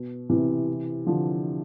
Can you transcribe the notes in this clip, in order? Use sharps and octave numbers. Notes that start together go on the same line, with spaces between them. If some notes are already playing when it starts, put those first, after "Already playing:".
Already playing: B2
C3 E3
D3 F3